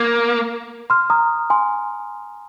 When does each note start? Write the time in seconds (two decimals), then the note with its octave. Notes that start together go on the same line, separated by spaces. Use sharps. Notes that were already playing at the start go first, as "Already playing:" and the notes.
Already playing: A#3 G#6
0.90 C6 F6
1.10 A#5 D#6
1.50 G#5 C6